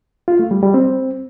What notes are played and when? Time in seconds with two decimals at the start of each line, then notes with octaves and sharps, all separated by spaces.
0.28 F4
0.39 A3
0.51 G3
0.63 G3
0.74 C4